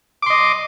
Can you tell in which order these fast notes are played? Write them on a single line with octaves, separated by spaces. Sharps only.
D6 C6 D#5